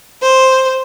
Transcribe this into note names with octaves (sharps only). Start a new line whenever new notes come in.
C5